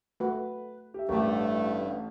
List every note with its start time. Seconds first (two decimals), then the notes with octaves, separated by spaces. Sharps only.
0.20 A3 F#4 B4
0.94 G4 E5
1.09 A1 G2 A3 G4 A#4